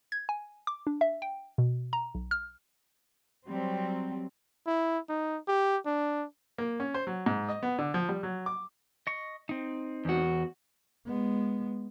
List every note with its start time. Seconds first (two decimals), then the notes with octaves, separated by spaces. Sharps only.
0.12 G#6
0.29 G#5
0.67 D6
0.87 D4
1.01 E5
1.22 G5
1.58 B2
1.93 A#5
2.14 B1
2.31 F6
3.47 F#3 G3 C4
4.67 E4
5.09 D#4
5.48 G4
5.86 D4
6.58 A#3
6.80 C#4
6.94 C5
7.07 F#3
7.26 G#2
7.49 D#5
7.63 B3
7.79 D3
7.94 F3
8.09 G3
8.23 F#3
8.46 D6
9.07 D#5 C#6
9.49 C4 D#4
10.05 E2 F#4
11.06 G#3 B3